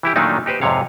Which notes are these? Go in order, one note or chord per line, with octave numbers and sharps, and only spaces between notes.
E3 E4 G4
A#2 D#3 F#3 A3 D4 D#4
D#4 G4 B4 C5
F2 G#2 C3 C#5 F5